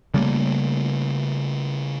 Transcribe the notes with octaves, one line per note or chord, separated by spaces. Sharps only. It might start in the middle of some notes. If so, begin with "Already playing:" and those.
C#3 G3 A3 A#3